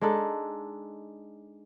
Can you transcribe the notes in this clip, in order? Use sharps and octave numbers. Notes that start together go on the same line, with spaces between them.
G#3 D4 D#4 A4